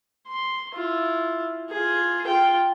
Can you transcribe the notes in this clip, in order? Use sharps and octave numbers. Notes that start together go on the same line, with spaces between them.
C6
E4 F4
F4 G#4
F4 G5